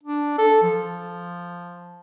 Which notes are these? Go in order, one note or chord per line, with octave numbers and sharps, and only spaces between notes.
D4
A4
F3